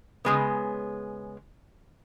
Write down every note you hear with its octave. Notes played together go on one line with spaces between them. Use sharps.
C#3 G#3 B3